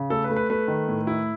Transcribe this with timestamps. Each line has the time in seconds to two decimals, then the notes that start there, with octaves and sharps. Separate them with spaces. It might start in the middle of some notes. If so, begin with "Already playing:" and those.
Already playing: C#3
0.10 A3 A4
0.24 B4
0.31 A3
0.36 B4
0.50 A3 B4
0.68 D#3
0.88 A2
1.07 E4